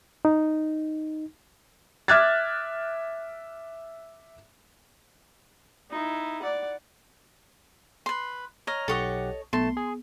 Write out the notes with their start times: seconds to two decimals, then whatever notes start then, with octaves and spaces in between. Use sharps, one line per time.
0.25 D#4
2.08 E5 D6 F6 F#6 G#6 A6
5.91 D#4 E4
6.42 D5 F#5
8.06 B4 C6
8.67 C#5 D#5 A#5 F6
8.88 B1 G4 A4 C#5 D#5 F#5
9.53 B1 A3 B3 A5 C6
9.77 G#4